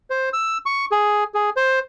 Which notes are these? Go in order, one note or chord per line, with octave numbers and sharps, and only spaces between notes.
C5
E6
C#6
G#4
G#4
C5